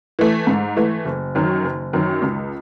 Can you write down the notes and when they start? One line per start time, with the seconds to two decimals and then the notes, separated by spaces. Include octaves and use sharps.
0.19 E3 A3
0.47 G#2
0.77 E3 A3
1.05 F#1
1.35 F#2 D#3 F#3
1.64 F#1
1.93 F#2 D#3 F#3
2.22 C#2